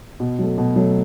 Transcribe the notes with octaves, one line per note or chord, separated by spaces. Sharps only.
B2
F#3 A3
B2
F#3 A3